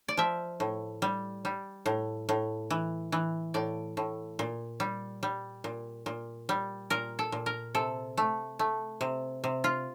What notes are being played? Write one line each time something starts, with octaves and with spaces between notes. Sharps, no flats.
D5
F3 E5
A2
G3
G3
A2
A2
E3
E3
A2 D5
A2
A#2
G3
G3
A#2
A#2
G3
A#2 A#4
A4
A#2
A#4
C3 A4
A3
A3
C3
C3
F4